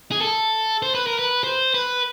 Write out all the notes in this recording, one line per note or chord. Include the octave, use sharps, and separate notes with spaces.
G#4
A4
C5
B4
A#4
B4
C5
B4